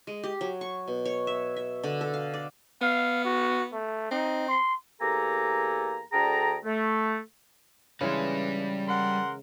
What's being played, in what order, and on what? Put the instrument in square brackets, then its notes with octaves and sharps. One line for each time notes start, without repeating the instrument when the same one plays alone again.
[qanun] G#3
G4
F#3
C#6
B2
C#5
E5
E5
D3
A4
F5
D5
[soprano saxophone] B3 [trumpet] F5
[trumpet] F#4
A3
[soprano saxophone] C4 [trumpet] D#4
[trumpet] C6
[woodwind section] E2 A#3 G4 A4 G#5 A#5
D2 D3 G#4 G5 A5 A#5
A3
[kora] C#3 E3 G#3 [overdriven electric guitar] G3 B4
[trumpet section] A#4 F#5 C6